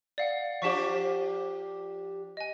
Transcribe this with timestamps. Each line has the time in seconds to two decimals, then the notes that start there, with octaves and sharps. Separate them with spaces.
0.18 D5 F5 F#5
0.62 F3 D4 G4 C#6 B6 E7
2.37 D#5 G#5